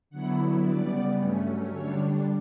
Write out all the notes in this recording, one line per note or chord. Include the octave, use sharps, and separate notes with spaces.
D3 F#3 B3 E4 F#5
C#3 G3 B3 D5
G2 F#3 A3 C#4
D3 G3 D4 C#5